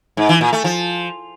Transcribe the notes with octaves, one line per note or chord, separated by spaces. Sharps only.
G#2
E3
A#2
A3
F3